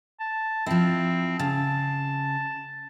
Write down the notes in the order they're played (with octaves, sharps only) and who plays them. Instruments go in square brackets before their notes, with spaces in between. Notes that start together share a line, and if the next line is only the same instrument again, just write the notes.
[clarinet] A5
[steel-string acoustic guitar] F3 E4 [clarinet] C4
[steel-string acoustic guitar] C#3 [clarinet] A5